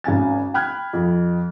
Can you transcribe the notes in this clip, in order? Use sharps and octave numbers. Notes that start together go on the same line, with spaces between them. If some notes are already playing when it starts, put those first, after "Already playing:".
G#1 C#4 G#5 A6
G5 B5 F6 F#6 G#6
F2